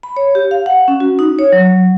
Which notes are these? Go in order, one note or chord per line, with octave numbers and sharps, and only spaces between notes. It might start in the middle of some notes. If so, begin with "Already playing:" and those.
B5
C#5
G4
F5
F#5
C#4
F#4
D#4
C#5
F#3